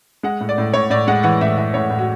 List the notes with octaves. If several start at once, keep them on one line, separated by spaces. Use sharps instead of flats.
G#3 F#5
A2
D5
A2
A2 C#5
A2 D5
G#3 F#5
E3 F#5
A2 E5
E3 E5
A2 C#5
A2
F#4